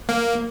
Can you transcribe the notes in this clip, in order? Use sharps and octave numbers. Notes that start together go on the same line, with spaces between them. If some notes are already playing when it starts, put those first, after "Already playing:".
A#3